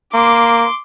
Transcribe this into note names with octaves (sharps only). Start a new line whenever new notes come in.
A#3 C6 D6